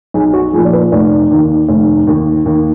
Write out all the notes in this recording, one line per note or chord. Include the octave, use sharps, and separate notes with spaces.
B1 G#4
F#4
A#2 F3 G#4
D5
B4
F1 D5
D#2 D#3
F1
D#2 D#3
D#2